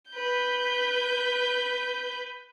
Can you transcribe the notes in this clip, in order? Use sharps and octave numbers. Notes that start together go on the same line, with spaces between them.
B4 G6